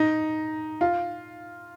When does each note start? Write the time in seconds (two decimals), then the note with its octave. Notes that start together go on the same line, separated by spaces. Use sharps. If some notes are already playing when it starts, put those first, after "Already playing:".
Already playing: D#4
0.81 F4